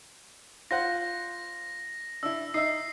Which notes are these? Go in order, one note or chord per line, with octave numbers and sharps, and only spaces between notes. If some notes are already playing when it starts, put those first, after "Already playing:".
F4 C5 F#5 A#6
D4 E4 E6
D#4 E5 C7